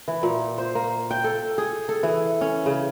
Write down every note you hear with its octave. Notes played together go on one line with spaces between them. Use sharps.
E3
A#2
C5
A#3
G5
A4
G#4
A4
E3
C#4
C#3